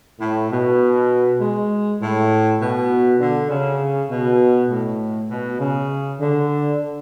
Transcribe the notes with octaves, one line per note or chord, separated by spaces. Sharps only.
A2
B2
G#3
A2
B2
D3
C#3
B2
A2
B2
C#3
D3